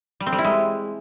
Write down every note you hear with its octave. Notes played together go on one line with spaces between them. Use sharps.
G3
C4
G3
E4
G#3